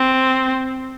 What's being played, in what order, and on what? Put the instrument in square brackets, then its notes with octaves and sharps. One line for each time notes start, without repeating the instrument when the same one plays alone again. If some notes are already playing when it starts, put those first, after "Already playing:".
Already playing: [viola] C4